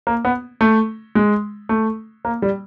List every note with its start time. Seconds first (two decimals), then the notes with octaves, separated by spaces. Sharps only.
0.07 A#3
0.25 B3
0.61 A3
1.15 G#3
1.69 A3
2.25 A#3
2.42 G3